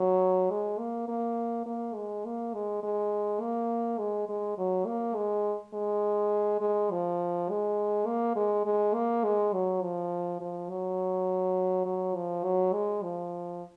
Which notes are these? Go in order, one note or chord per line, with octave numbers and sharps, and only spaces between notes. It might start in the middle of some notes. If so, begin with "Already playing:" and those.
Already playing: F#3
G#3
A#3
A#3
A#3
G#3
A#3
G#3
G#3
A#3
G#3
G#3
F#3
A#3
G#3
G#3
G#3
F3
G#3
A#3
G#3
G#3
A#3
G#3
F#3
F3
F3
F#3
F#3
F3
F#3
G#3
F3